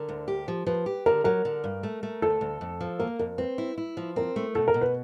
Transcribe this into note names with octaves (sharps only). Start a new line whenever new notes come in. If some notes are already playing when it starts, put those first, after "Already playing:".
Already playing: D3 A#4
D2
G4
F3
F3 B4
G4
D3 A#4
F#3 A#4
D3
G2
A3
A3
D2 A4
D2
F2
F3
A#3 A#4
F2 A#4
C4 B4
E4
E4
F3
C4 A#4
A3
B2 A4
A#4
B2
B4